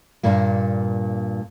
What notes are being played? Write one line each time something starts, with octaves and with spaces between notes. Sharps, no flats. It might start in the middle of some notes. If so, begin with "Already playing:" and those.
G2 A#2 A#3